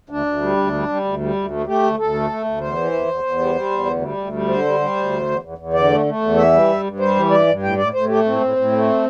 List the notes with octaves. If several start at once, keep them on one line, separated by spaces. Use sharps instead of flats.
D2 D4
D2
G3
D2
G3
G3
D2
G3
D2
A3
A3 G4
D2
D2 A4
A3
A3
D2
E2 C5
E3
E2
E2
E2
G3
G3
E2
D2
G3
D2
G3
D3 C5
G3
G3
D2
E2
E2
E2
E2
D3 D5
A3
A3
E2
E3 E5
G3
G2
G2
G3 C5
E3
G2 D5
G2
A2 G5
A2 D5
A2 C5
A3 G4
A2 C4
A2
A2
A3